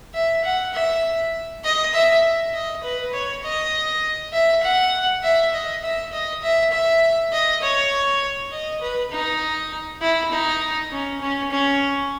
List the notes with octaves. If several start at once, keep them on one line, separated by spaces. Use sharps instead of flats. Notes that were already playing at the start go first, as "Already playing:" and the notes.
E5
F#5
E5
D#5
E5
D#5
B4
C#5
D#5
E5
F#5
E5
D#5
E5
D#5
E5
E5
D#5
C#5
D#5
B4
D#4
E4
D#4
C#4
C#4
C#4